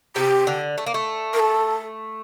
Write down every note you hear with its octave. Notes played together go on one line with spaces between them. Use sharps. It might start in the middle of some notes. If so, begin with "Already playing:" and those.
C3 G4
D3
A3
A#3
A3
A#4
A4